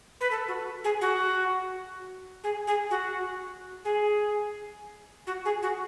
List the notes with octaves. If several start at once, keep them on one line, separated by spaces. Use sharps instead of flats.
B4
A4
F#4
G#4
F#4
G#4
G#4
F#4
G#4
F#4
G#4
F#4